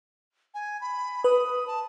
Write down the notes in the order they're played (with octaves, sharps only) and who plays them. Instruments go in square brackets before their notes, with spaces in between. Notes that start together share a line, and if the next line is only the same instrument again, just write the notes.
[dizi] G#5
B5
[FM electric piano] B4 [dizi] D#6
[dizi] A5